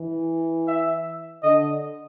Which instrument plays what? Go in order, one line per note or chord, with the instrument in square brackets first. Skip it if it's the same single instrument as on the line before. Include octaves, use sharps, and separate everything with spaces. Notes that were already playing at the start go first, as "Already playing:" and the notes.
Already playing: [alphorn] E3
[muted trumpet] E5
[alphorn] D3 [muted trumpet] D#5